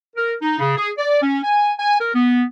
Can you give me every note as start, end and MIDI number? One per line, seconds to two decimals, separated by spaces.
0.16 0.33 70
0.42 0.56 63
0.60 0.77 49
0.77 0.90 68
0.98 1.20 74
1.22 1.40 61
1.43 1.73 80
1.79 1.98 80
2.00 2.12 70
2.15 2.44 59